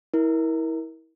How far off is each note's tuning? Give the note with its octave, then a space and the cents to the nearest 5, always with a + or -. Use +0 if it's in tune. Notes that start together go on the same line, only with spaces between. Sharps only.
E4 -25 A#4 +15